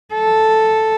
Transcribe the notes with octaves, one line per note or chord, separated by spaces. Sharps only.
A4